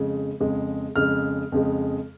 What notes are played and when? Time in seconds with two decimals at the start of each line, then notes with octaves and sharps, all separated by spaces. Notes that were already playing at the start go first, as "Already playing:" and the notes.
Already playing: F2 C#3 G#3
0.40 F2 C#3 G#3
0.96 F2 C#3 G#3 F6
1.52 F2 C#3 G#3